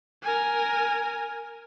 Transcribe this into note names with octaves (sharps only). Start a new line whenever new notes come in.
A#4 G#5